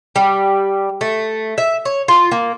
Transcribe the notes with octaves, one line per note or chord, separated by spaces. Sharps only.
G3
A3
E5
C#5
F4
A#3